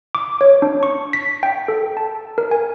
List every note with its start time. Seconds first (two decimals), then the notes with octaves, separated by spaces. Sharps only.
0.15 D6
0.41 C#5
0.62 D4
0.83 C#6
1.13 B6
1.43 G5
1.68 A4
1.97 A5
2.38 A#4
2.51 G#5